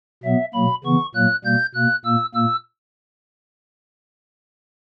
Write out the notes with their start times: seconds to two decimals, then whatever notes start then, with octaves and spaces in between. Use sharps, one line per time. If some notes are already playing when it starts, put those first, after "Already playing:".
0.23 B2 F#3 B3 E5
0.54 B2 F#3 A#3 B5
0.84 C#3 E3 B3 C#6
1.14 A#2 F#3 A#3 F#6
1.45 B2 G3 A#3 G6
1.74 B2 A#3 F#6
2.05 A#2 A#3 E6
2.35 A#2 A#3 E6